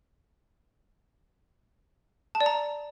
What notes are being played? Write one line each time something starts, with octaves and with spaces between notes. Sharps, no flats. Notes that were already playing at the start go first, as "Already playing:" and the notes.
A5
D5
A#5